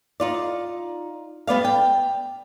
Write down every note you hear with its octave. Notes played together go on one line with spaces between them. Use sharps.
D#4 F4 D5
G3 B3 D5 F5
G5